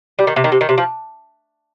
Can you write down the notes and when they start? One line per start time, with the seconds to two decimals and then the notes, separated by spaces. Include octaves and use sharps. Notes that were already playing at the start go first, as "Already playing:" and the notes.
0.19 G3
0.27 D#3
0.36 C3
0.44 D#3
0.52 C3
0.61 D#3
0.69 C3
0.78 F3